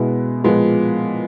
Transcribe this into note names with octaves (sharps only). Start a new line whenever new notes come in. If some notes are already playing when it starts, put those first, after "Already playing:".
Already playing: B2 G#3 B3 E4
A#2 F3 G#3 B3